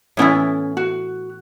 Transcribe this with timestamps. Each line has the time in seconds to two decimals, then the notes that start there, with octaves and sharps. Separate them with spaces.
0.17 A2 E3 B3 C#4 E4 A4
0.77 F#4